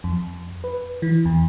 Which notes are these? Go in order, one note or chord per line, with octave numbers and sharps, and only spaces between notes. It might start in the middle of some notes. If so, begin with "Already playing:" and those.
F2
B4
E3
E2